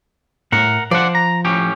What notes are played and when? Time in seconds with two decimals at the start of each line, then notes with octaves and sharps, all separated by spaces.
0.52 A2 A#4 F#5
0.91 F3 C5 D5 F#5
1.15 A#5
1.45 A2 C#4 G4